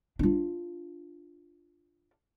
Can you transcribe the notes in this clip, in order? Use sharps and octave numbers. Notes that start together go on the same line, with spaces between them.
D4 F4